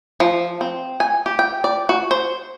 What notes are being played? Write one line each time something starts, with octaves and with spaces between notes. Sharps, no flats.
F3
C4
G#5
G4
G5
D5
F#4
C5